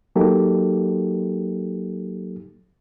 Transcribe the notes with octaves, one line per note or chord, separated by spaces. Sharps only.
F#3 A#3 D#4 G4 A4